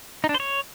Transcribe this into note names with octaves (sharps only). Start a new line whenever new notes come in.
D#4
D4
C5
C#5